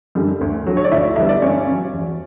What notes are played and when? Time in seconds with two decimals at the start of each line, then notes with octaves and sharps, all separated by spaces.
0.15 F#2 D3 G3
0.41 D2
0.66 D3 F#3
0.77 C#5
0.84 D5
0.91 D2 E4 E5
1.16 D3 G3 B3 E5
1.29 D5
1.42 G2 C#4 C#5
1.67 F#3 C#4
1.93 E2